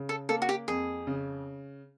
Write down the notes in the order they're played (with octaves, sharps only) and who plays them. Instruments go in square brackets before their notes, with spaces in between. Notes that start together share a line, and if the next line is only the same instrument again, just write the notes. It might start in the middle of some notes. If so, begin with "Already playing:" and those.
Already playing: [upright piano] C#3
[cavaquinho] A4
[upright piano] A#3 [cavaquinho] A4
[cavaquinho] F#4
G4
[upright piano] F2 [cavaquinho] G#4
[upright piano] C#3